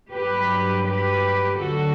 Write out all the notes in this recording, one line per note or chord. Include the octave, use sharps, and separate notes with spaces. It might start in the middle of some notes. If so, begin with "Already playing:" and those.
G2 F#3 G4 B4
G4 B4
D2 D3 F#3 F#4 A4